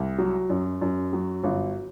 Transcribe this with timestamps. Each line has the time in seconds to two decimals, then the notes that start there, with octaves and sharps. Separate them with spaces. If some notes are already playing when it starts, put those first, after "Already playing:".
Already playing: C2
0.19 F#3
0.50 F#2
0.82 F#2
1.13 F#3
1.44 G1